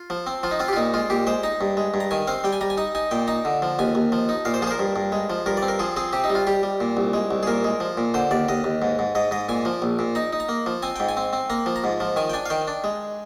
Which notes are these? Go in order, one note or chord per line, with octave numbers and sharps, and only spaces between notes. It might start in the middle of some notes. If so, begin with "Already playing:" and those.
Already playing: F4
F3
C4
F3 F4
D#4
C4 F4
G4
F4
A#2 D#4
G#3 F4
A#2 G4
G#3 C5
D#4 A#5
G2
G#3
G2
A#5
D#3 G#5
C4 F5
G3 G5
G#5
G3 A#5
G#5
D#4 A#5
D#4 G#5
A#2 G5
D#4 A#5
D3
F3
D#2 G#5
D#2
F3
D#4
A#2 F5
C5
F3 G#4
C5
A#4
G2
G2
G#3
F3
G2 A#4
D5
C4
A#4
F3 G#4
C4 G#4
C3 G4
D#4
G3
F4
G3 G4
G3
A#2
C2
G#3
C2
G#4
A#2 A#4
G#3
F3
A#2
D3 C5
D#2 D5
D#2 D#5
D#2
G#2
G#2
G#2 D#5
G#2 D#5
A#2 G#5
F3
A#1
A#2
D#4 A#5
D#4
A#5
A#3
F3
C4 G#5
G#2 G5
G#5
C4
C4
A#3 A#5
F3
A#5
G#2
F3
D#3 G#5
G5
D4 G#5
F5
D#3 G5
D4
G#3